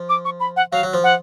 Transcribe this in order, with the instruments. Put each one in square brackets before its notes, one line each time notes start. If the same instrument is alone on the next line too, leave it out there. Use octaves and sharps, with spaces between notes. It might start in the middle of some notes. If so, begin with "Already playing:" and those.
Already playing: [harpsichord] F3
[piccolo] D6
C#6
B5
F#5
[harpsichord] F#3 [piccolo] F5
[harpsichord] F#3
F3
[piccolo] F#5